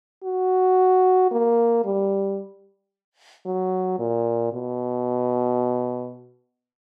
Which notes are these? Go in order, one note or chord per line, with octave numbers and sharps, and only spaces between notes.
F#4
A#3
G3
F#3
A#2
B2